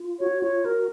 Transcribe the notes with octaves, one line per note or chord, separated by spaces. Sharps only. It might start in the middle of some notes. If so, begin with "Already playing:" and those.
Already playing: F4
F#4 C#5
F4 C#5
F#4 A#4